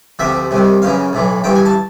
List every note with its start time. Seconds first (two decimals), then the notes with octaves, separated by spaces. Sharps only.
0.19 D2 C3 F3 E5
0.51 C2 C3 D#3
0.82 F#2 C#3 E3 F5
1.13 B1 A2 E3
1.44 A1 G2 E3 G5
1.55 G#5
1.65 A5